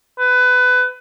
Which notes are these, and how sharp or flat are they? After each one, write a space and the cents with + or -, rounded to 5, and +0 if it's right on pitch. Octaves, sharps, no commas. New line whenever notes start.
B4 +20